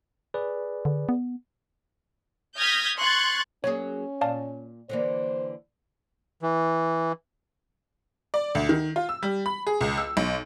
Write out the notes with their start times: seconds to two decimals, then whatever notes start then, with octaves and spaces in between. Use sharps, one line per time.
0.34 G#4 B4 D5
0.85 D3
1.09 B3
2.56 D#6 F6 G6 G#6 A#6 B6
2.99 C6 C#6 F#6 G#6 A6
3.64 F#3 A#3 C#4 G#4 C#5
4.21 A#2 D5 F5 A5
4.89 D3 E3 A#3 C5
6.42 E3
8.34 D5
8.55 D2
8.69 D#3
8.96 F4
9.09 E6
9.23 G3
9.46 B5
9.67 G#4
9.81 C#2
9.97 E6
10.17 B1